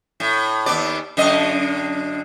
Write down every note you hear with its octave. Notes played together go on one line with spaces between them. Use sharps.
A2
D#2 B3 D5
F#2 D3 D#5